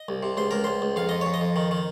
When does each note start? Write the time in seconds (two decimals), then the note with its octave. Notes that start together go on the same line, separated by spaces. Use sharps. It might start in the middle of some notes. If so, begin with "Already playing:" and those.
Already playing: D#5
0.08 C2
0.23 C3
0.37 C#2 C5
0.51 C#2 A#4
0.64 C#2 C5
0.82 C#2
0.96 F2 F5
1.09 F2 D#5
1.21 F2 C#5
1.34 D#5
1.41 F2
1.56 D#3
1.71 D#3